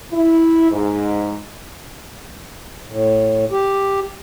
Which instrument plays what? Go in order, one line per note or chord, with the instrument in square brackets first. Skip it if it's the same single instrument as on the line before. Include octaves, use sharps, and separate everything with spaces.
[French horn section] E4
G#2
[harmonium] A2
G4